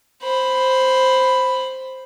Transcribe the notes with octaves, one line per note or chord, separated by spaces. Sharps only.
C5 B5